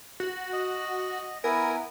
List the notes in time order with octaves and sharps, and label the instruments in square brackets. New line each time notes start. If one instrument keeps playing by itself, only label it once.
[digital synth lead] F#4
[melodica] D#5
[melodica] B3 E4 G#5 [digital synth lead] A#4